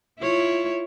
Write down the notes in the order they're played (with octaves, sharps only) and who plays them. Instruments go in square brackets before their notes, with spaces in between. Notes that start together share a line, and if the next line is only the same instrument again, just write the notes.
[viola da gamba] E4 F4 C#5